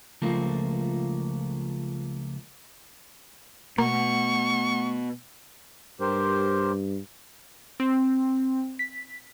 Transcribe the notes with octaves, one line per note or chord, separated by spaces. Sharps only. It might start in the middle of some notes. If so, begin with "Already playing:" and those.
C#2 F3 A3 A#3
B2 A3 A#3 F#5 C#6
G2 G4 A#4 C5
C4
B6